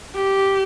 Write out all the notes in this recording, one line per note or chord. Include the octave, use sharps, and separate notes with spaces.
G4